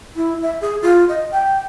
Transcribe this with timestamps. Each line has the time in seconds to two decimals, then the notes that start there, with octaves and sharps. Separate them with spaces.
0.16 E4
0.43 E5
0.61 G#4
0.82 F4
1.09 D#5
1.32 G5